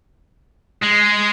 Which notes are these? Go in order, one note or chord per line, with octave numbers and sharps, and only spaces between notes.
G#3